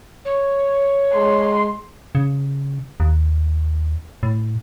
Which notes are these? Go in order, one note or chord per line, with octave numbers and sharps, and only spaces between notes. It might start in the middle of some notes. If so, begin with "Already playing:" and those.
C#5
G#3 C6
C#3
D#2
A2